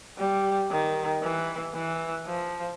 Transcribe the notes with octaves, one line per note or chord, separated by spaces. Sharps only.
G3
D#3
E3
E3
F3